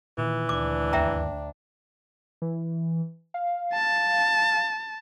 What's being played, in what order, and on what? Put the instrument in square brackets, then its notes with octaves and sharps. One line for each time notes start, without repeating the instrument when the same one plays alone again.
[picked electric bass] A#2 D#3 [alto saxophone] E3
[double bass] D2 D4 [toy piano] D6
[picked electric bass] G1 D#2 [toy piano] E5 G5 A#5
[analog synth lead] E3
F5
[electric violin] A5